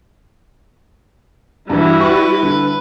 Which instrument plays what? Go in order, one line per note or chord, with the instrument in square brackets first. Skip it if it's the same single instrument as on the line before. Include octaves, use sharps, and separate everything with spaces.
[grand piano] G2 E3 [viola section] G3 E4 F#4
[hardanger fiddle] B4 [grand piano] C#6
[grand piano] D3